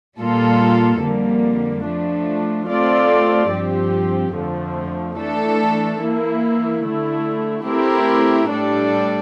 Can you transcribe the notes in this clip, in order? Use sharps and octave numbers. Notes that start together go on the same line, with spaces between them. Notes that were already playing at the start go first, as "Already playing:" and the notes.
A#2 G3 A#3 F4 A4
F2 D3 G3 A#3
F3 A3 D4
A3 C4 F4 A4 D5
G2 F3 C4 G4
F2 D3 F3 A3
E3 A3 D4 A4
E3 A#3 E4
D3 A3 E4
A3 C4 E4 G4 A#4
A2 G3 D4 A4 D5